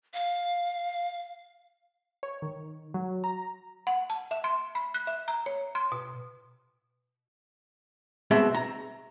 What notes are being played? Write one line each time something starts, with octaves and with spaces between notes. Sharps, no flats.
F5
C#5
D#3
F#3
A#5
F#5
A5
E5
C6
B5
F#6
E5
A#5
C#5
C6
B2
B2 G#3 C4 E5 A5
A#5